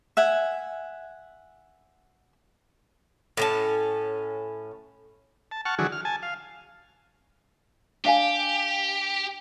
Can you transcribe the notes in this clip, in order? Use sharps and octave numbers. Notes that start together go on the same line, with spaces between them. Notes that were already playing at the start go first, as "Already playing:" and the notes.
E5 F#5 G#5
A2 C#4 A5
A5
F#5 A5 C#6 F6
D3 E3 F#3 F#4 G#4
F6
G#5 A5
F5
D4 G4 F5 G#5